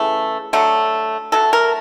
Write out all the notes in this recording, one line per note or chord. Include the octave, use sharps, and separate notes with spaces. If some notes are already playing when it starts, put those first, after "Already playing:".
Already playing: C#3 E3 A3
D3 F#3 A3
D3 F#3 A3 A4
A#4